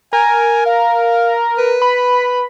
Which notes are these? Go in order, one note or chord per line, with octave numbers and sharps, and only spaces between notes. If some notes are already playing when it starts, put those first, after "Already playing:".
A#4 G#5
F5
B4
B5